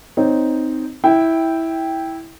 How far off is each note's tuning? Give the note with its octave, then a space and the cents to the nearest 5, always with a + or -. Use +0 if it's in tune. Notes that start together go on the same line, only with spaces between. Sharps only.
C4 -10 D#4 +0 C#5 +0
E4 -10 G5 +0